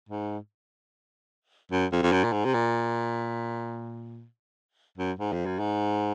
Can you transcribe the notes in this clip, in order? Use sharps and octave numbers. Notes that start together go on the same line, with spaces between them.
G#2
F#2
F2
F2
F#2
A#2
G#2
C3
A#2
F#2
G#2
F2
F#2
G#2